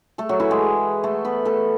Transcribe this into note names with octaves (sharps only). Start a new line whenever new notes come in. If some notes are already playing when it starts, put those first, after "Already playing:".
A3 A4
F#3 F#4
E3 E4
G#3 G#4
A3 A4
B3 B4
A3 A4